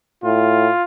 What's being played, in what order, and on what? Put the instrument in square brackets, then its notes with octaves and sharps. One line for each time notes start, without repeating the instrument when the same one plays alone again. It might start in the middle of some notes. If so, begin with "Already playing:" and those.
[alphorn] A2 [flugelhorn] F4